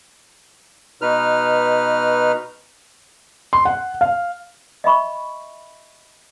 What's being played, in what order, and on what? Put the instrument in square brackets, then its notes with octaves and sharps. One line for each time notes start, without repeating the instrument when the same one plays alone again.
[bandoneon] B2 D#4 B4 F6
[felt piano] C6
F#5
F5
[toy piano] D#5 E5 B5 C#6